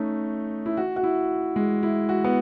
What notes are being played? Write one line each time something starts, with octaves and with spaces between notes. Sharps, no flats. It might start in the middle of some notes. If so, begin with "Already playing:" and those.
Already playing: A3 C#4 D#4
E4
F#4
F#4
E4
G#3
E4
F#4
B3